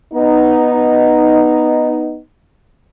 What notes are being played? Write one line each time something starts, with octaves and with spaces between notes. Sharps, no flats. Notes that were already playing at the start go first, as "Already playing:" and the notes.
B3 D#4